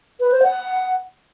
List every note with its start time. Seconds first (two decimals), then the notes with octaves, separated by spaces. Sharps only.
0.20 B4
0.31 C5
0.43 F#5